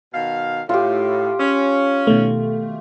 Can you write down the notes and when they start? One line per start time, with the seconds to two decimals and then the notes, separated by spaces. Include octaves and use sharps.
0.14 B2 D#3 F5
0.69 A2 F4 G4
1.39 C#4
2.07 B2 D#3 A3